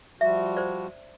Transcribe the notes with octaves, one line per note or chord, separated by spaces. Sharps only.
F3 G3 F#4 E5
C5 D5